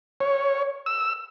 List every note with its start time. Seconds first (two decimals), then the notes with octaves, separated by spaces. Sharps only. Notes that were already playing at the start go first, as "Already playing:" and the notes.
0.21 C#5
0.86 E6